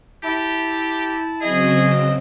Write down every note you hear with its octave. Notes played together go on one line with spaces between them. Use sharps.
E4 G4 A5
C#3 F#3 C4 G#4 D#5